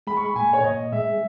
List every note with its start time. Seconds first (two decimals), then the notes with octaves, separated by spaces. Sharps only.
0.07 G#3 B5
0.17 C#6
0.26 B5
0.36 A#2 G#5
0.53 C#5
0.64 A#2 D#5
0.92 G#3 E5